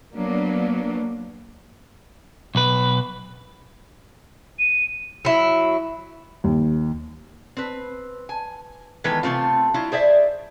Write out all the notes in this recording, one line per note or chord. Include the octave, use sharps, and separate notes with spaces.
F#3 A#3 B3 D4
B1 B4
D#7
F#3 E4
D#2
C4 B4
G#5
D#3 E3 G#3 B3 A4 B4
C3 A3 C4 F4
F#3 E4 F4
G#4 C5 D5 E5